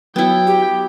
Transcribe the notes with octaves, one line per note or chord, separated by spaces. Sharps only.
F#3 B3 E4 G5
G4